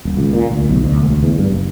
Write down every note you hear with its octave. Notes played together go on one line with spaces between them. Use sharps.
D#1
C#2
A#2
D2
B1
D2
E1
D2
E2
G2
F#1